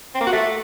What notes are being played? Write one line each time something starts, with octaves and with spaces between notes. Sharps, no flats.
C4
A#3
F#4
A3